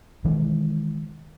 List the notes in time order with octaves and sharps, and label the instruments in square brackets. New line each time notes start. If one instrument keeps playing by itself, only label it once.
[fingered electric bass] B2 D#3 E3 G#3